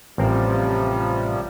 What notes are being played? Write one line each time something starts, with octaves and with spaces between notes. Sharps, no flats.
A1 C3 F3 G3 C4 A#4